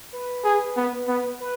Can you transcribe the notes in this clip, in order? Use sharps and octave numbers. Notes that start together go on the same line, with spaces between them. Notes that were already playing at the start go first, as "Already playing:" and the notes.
B4
G#4
B3
B3
B4